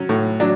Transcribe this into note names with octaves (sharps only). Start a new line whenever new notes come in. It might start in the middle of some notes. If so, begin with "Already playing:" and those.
Already playing: F#3 C#4
A2
F#3 D4